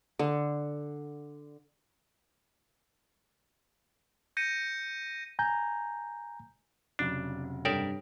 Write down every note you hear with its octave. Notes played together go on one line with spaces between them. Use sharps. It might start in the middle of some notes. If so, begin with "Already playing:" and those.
D3
G6 A#6 C#7 D#7
G#5 A#5 G6
F1 C#3 F#3 D4
G2 A4 A#4 C#5 D5 E5 G5